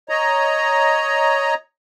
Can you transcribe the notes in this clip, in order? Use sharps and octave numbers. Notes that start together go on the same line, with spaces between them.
C#5 D#5 A#5